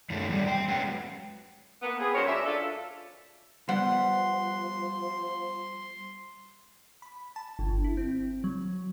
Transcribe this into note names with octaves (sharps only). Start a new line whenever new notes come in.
F#2 D#3 F#3 A3
E2 G3
C5 G5
F#3 G#3 C#4 B4 F#5
A#3 B3
B3 C4 G#4
F#2 G#3 A#4 C5 C#5
D4 E5
D4 F4 A4
F3 G3 B3 F#5 C6
B5
A5
G1
E4
C4
F#3